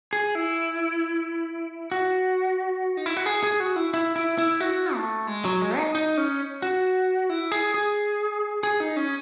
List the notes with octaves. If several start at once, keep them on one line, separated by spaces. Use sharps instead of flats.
G#4
E4
F#4
D#4
E4
F#4
G#4
G#4
F#4
E4
E4
E4
E4
F#4
A3
G#3
F#3
G#3
D#4
D#4
C#4
F#4
E4
G#4
G#4
G#4
D#4
C#4